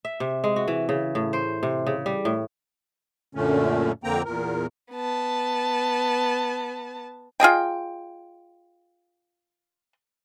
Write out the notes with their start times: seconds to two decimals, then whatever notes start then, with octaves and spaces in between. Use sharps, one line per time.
0.05 E5
0.20 C3
0.44 G#3
0.56 F#4
0.68 E3
0.89 C#3
1.15 A2
1.33 C5
1.63 C3
1.87 C#3
2.06 G3
2.25 A2
3.35 F#2 A#2 D3 A3 C#4
4.04 F2 D3 A#3 C4 G5 A#5
4.25 E2 A#2 A#4
4.92 B3 A5
7.40 F4 G#4 D#5 G5